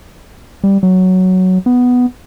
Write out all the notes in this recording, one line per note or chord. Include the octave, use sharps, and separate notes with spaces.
G3
F#3
B3